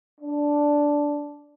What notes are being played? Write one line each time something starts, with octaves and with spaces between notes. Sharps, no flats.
D4